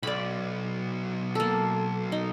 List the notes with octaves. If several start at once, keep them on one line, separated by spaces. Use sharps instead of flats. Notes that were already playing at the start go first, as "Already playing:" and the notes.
B1 D5 B5
A#3 A4
D#4